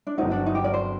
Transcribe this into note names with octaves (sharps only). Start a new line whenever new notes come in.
D4
G1 G2 F#3 C4 D#4 F#4
D4
D#4
G4
A#4 D5
C5